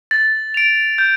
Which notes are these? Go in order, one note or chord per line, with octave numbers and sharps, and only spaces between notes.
A6
D7 F7
G6